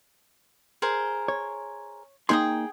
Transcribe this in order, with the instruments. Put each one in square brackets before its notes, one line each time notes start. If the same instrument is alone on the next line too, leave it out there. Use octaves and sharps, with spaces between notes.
[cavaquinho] G#4 A#4 C5
[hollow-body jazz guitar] C#5
[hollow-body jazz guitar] A#3 D#4 C6 [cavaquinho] G#4 G5 D#6